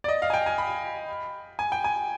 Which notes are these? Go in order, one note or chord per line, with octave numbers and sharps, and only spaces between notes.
D5
D#5
F5
G#5
G5
G#5
B5
G#5
G5
G#5